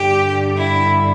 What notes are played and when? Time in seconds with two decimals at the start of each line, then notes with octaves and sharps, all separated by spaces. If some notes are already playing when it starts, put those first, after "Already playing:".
Already playing: G2 D3 G3 G4
0.56 E4